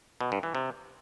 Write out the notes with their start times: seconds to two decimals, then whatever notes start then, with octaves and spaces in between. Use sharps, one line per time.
0.21 B2
0.32 G2
0.43 E3
0.55 C3